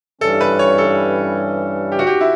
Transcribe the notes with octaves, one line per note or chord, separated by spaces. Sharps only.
G2 E3 G3 C#4 A4
B4
C#5
A4
G4
F#4
G4
E4